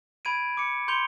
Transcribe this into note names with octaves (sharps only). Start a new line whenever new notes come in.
B5 G#6 D7 D#7
D6 C#7
C6 G6 C#7 F7 G7